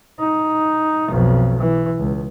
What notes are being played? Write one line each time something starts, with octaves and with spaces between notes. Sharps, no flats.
D#4
B1 F2
E3
C#2